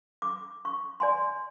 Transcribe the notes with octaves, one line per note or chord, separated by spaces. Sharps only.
D6
C#6
D5 G#5 C6